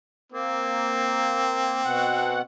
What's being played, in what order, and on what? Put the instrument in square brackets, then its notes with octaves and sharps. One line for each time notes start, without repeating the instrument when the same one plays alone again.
[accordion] A#3 [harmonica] C4
[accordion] B2 F#5